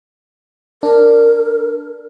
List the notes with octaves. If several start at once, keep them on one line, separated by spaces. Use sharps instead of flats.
D4 A#4